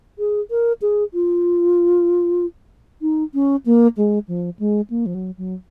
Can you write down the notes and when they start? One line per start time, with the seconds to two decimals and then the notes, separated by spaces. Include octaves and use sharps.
0.19 G#4
0.51 A#4
0.82 G#4
1.14 F4
3.02 D#4
3.34 C#4
3.66 A#3
3.97 G#3
4.28 F3
4.59 G#3
4.90 A#3
5.06 F3
5.14 F#3
5.38 F#3